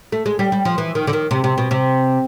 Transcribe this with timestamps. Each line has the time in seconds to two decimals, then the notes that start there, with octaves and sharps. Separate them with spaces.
0.12 A3
0.26 G#3
0.39 G3
0.52 G3
0.65 F3
0.78 E3
0.95 D#3
1.07 D3
1.13 D#3
1.31 C3
1.44 C3
1.58 B2
1.71 C3